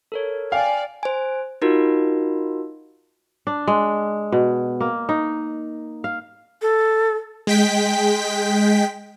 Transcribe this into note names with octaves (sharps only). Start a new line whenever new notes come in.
A4 A#4 C#5
D5 F5 G5 G#5
C5 G#5
D#4 F4 F#4 A#4
D4
G#3
B2
A#3
D#4
F5
A4
G#3 G5 B6